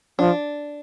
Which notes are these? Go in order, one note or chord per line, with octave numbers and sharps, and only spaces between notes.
F3 D4